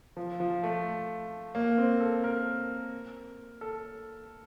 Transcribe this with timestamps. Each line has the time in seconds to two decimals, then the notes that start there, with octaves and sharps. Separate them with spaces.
0.17 F3
0.40 F3
0.63 A3
1.55 A#3
1.78 C4
2.01 A4
2.24 A#4
3.61 A4